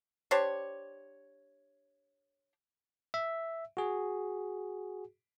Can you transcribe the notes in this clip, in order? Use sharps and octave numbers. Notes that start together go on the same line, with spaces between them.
D4 G4 C5 C#5
E5
F#4 G#4